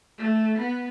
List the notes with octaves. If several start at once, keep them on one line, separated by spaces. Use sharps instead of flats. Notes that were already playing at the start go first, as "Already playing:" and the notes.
A3
B3